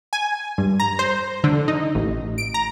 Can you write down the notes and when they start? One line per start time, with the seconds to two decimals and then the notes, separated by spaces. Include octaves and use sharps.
0.13 G#5
0.58 G2
0.80 A#5
0.99 C5
1.44 D3
1.68 D#4
1.95 A1
2.38 D7
2.54 A#5